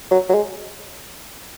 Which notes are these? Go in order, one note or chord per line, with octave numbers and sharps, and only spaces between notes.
F#3
F#3
G#3